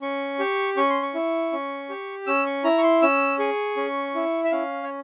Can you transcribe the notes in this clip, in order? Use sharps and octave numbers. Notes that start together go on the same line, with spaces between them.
C#4 C#6
G4
C#4 C#6
C6
C#6
E4
C#4
G4
C#4 E6
C#6
E4 A#5
C#6
C6
C#4 E6
G#4 C#6
C#4
E4
E5
C#4 F5
C#5